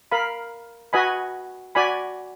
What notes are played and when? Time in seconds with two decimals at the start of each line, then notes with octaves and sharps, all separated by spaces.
0.12 A#4 F5 B5
0.93 F#4 B4 D#5 G#5 B5
1.75 F#4 D5 G#5 B5